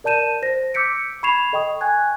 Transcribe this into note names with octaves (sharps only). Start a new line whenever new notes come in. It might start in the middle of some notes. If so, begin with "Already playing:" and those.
A#4 D5 A5 G6 D#7 E7
C5 A#6
D6 E6 G6 B6 C#7 D7
B5 C#6 G#6 C7 E7 F7
A4 D#5 G5 C#6 D#6
G5 G#5 C#6 F#6 G#6